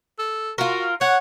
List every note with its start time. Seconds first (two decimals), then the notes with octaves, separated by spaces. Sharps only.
0.19 A4
0.58 F4 F#4 A#4
1.01 C#5 F#5